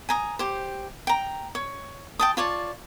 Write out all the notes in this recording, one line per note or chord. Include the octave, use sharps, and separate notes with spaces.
G#5 A#5 D#6
G4 C5
G5 A#5
C#5
G5 A5 D#6
F4 C#5 D5 A5